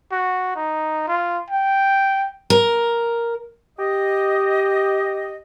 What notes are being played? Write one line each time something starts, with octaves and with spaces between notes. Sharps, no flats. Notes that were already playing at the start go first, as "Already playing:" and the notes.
F#4
D#4
F4
G5
A#4
G4 D#5